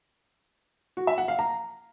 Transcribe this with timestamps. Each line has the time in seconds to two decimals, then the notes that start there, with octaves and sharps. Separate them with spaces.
0.97 F#4
1.07 E5
1.18 F#5
1.28 F5
1.39 A#5